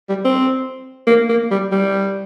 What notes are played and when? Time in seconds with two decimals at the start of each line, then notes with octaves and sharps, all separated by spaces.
0.09 G3
0.25 C4
1.07 A#3
1.29 A#3
1.51 G3
1.72 G3